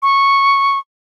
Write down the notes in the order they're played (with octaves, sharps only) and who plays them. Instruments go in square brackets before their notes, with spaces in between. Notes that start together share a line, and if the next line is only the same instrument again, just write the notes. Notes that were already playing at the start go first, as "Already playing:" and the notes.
[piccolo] C#6